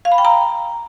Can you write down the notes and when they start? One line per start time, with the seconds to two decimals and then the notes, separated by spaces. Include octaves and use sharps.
0.05 F5
0.12 B5
0.18 G5
0.25 A#5